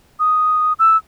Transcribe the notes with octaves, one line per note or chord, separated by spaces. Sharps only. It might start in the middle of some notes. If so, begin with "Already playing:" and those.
D#6
E6